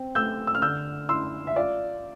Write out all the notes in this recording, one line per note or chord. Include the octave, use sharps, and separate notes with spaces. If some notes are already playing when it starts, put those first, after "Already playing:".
Already playing: C4
A3 E6 G6
E6
F6
D3 E6 G6
E4 C6 E6
E5
F4 D5 F5